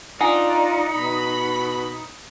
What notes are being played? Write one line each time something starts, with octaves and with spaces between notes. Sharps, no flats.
D4 D#4 F4 F#5 G#5
B2 B5